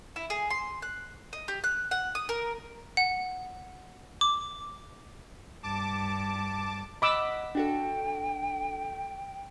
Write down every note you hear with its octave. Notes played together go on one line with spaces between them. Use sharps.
E4
G#4
C6
F#6
D#5
G4
F#6
F#5
D#6
A#4
F#5
D6
G2 A5 D6
D#5 F#5 B5 D6 E6 B6
D4 F#4 A4 G5